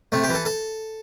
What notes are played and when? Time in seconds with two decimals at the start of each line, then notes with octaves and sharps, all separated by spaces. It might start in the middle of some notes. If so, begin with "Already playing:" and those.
0.12 C3 A3
0.24 G4
0.29 E3 A4
0.45 A4